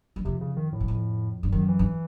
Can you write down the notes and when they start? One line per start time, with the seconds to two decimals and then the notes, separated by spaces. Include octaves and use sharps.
0.16 F#2
0.25 F2 C3
0.41 C#3
0.57 D#3
0.73 A2
0.80 F#2
0.88 F2
1.43 G2
1.52 F#2 D#3
1.68 E3
1.79 G2